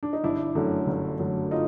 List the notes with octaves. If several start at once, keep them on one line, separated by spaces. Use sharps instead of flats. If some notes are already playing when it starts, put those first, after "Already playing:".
D4
D#4
G1 D4 E4
F#2 D3 F#3 A3
G1
F#2 D3 F#3 A3
D#4 F4